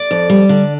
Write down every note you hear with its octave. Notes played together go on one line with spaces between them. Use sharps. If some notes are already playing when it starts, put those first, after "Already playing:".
Already playing: D5
F2
G3
D3